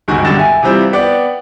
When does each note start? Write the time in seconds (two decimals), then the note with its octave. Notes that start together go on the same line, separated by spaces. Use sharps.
0.08 G1 C#2 F#2 D#3 F#4
0.24 E1 G2 D3 G4 A6 E7
0.38 E5 G#5
0.63 C3 E3 G3 C4 E4 F4
0.93 B3 D5 F#5 G5